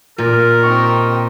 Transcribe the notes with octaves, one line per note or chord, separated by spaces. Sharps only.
A#2 A#4
C4 D#4 G4 C#6